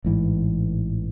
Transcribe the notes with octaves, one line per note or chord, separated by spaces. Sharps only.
A1 G#2 E3